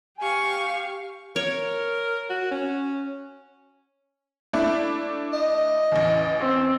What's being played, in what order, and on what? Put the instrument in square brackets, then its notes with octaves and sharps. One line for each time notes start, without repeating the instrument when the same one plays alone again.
[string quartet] G4 F5 C#6 [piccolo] G#5
[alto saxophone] A#4 [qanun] C#5
[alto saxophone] F#4
C#4
[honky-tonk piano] A3 D4 E4
[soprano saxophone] D#5
[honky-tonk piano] A1 E2
[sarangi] C4